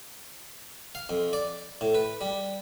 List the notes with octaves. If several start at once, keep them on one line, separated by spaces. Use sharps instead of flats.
F5
F2
D5
A2
B4
G3